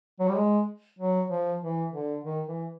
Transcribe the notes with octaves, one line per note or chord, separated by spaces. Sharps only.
F#3
G3
G#3
F#3
F3
E3
D3
D#3
E3